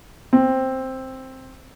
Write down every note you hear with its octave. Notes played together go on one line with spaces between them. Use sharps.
C4